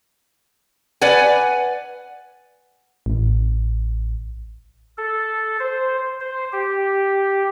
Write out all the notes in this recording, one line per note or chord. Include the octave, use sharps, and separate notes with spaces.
B4 D5 F#5 G#5
A1
A4
C5
C5
G4